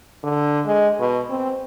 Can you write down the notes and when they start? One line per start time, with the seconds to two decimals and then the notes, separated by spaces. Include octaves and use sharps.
0.24 D3
0.66 G#3
1.00 B2
1.30 C4